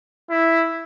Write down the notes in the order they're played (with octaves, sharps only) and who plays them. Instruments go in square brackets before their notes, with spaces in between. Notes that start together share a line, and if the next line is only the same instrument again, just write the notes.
[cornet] E4